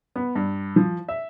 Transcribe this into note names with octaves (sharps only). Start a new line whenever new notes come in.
B3
G2
F3
E5